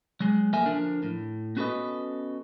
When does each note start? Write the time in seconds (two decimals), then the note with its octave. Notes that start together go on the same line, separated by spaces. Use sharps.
0.20 F#3 G#3
0.53 F3 A#3 A4 A#4 E5 G#5
0.66 D3 F3 D4 A#4
1.03 A2
1.57 B3 C#4 F#4 A4 B4 D#5